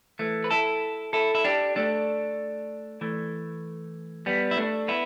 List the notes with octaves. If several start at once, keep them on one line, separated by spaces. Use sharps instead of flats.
E3 A3
B4
E4 A4
E4 A4
E4
D4 G4
A3 D4
E3 A3
G3 B3
E4
A3 D4
B3 E4